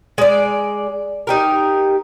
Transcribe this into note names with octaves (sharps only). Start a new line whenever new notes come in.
G#3 D5
D#4 G4 A#4